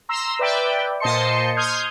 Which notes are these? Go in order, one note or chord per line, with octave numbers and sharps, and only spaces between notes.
A#5 C6 E6
B4 D5 E5 G5
A#2 C5 D#5 A5 C6 C#7
C6 D#6 F6 G6 G#6